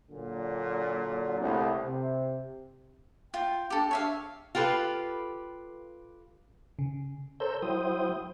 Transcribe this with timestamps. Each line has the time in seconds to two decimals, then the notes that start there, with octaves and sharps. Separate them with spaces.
0.10 A#2 D3 F#3
1.40 C2 A2
1.83 C3
3.34 F4 G5
3.70 D4 G4 A4
3.91 C#5 E5 F5
4.55 F4 G4 A4 B4
6.79 C#3
7.40 A4 A#4 C5 C#5 E6 G6
7.62 F#3 E4 C5 G5 D#6